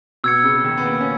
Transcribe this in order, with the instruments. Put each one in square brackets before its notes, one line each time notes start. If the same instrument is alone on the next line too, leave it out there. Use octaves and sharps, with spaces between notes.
[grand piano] B2 [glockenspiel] E6 G#6 C#7
[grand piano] C#3
C#3
D#3
B3
A#3
C#4